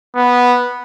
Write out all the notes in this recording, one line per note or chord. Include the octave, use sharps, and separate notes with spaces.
B3